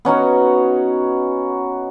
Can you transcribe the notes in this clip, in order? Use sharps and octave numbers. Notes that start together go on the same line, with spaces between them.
B3 C#4 D#4 F#4